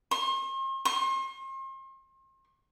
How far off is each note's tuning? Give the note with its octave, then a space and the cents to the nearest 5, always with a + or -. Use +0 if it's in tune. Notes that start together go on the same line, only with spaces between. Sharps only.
C6 +45
C6 +40